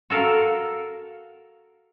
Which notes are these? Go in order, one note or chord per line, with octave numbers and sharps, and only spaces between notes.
F#4 A4 A#4 F5